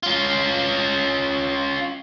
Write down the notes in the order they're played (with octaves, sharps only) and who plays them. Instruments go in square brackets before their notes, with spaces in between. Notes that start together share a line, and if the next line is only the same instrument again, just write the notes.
[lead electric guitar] C#4 F4